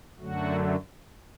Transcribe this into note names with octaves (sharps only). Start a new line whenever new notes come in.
F#2 D3 F#3 A3 F#4